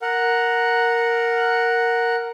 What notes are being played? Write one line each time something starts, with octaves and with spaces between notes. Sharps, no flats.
A#4 F#5